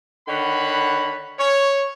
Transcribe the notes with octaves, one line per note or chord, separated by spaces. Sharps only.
D3 D#3 C#5 F#5 B5
C#5